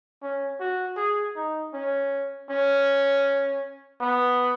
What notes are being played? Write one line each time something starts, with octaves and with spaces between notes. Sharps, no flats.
C#4
F#4
G#4
D#4
C#4
C#4
B3